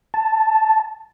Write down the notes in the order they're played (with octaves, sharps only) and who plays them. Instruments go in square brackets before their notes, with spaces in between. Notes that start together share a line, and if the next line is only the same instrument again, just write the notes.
[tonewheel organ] A5